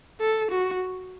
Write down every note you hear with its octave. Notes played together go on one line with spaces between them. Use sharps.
A4
F#4